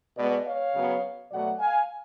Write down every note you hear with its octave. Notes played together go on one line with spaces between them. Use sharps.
B2 G#3 B3 B4 D5
C#5 F5
C#3 F#3 B3
B2 F#3 A3 D5 F#5
F5 G#5